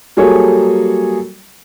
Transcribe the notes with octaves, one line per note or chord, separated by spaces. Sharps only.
F#3 G3 A#3 G#4 A4 C#5